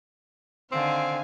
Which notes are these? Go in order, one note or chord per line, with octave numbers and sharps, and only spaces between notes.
D3 D#3 C4 F5 G#5